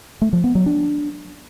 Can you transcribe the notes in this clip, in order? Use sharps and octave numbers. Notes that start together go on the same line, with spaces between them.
A3
F3
B3
F#3
D4